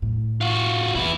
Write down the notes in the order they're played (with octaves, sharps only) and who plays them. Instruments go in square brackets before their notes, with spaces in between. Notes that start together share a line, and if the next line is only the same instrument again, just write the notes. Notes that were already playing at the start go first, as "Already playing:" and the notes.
[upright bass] A2
[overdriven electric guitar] F4 F#4
[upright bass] A#2 [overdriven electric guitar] B3 E4